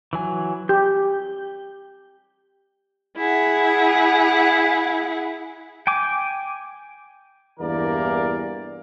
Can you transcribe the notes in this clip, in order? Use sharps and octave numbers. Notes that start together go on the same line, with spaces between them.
E3 F#3 G#5
G4 G6
E4 G#4 F#5
G5 G#5 D6
E2 G2 E3 A#3 A#4 D5